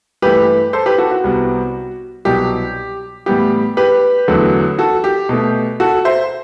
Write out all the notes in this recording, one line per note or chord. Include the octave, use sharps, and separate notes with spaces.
G2 E3 A3 G4 B4
A4 C5
G4 B4
F#4 A4
F#4
C2 C3 G3 B3
C2 B2 F#3 G4
A2 E3 G3 B3 G4
G4 B4
E2 D3 F#3 A3
F#4 A4
G4
B2 A3
F#4 A4
C5 E5